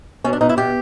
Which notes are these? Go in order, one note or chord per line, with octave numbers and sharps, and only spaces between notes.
B2 C#4
D4
B2 D#4
E4
B2 G4